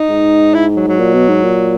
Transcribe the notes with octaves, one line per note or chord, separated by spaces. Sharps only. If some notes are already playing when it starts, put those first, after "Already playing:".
Already playing: D#4
G#2
E4
F#3
F#3
A#2
B2
G#2
A#2